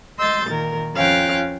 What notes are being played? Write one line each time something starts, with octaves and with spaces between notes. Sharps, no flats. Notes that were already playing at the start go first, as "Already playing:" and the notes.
D#5 C6 E6 G6 A6
A#2 D#3 A#4
F2 C#4 F4 F5 G5 F#6